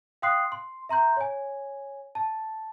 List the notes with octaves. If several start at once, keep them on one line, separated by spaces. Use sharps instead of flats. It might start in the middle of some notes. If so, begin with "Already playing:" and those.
F5 G5 C6 D#6 F#6 C7
C6
E5 A#5 C6 G6
C#5 G#5
A5